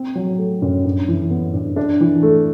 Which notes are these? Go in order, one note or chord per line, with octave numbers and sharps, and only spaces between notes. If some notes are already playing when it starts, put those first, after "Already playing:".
Already playing: C4
F#3
A3
F#2
G2
E3
B3
G2
D4
E3
A3